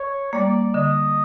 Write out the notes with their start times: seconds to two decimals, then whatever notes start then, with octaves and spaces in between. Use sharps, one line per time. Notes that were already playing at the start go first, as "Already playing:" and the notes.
Already playing: C#5
0.33 G3 A#3 D5
0.74 D3 D#5